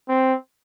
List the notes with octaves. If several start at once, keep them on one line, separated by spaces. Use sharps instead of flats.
C4